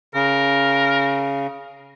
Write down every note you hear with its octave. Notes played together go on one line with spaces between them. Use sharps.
C#3 A#4